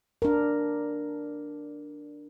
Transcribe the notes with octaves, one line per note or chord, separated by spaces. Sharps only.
D4 A#4